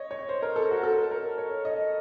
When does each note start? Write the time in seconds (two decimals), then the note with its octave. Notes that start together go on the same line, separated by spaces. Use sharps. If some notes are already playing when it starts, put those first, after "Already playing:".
Already playing: C#5 D#5
0.11 C#5
0.29 C5
0.42 A#4
0.56 A4
0.70 F#4
0.83 A4
0.97 A#4
1.11 A#4
1.38 C#5
1.65 D#5